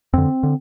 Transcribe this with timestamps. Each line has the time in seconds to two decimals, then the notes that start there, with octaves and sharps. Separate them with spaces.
0.13 F2 D3 C4
0.43 D3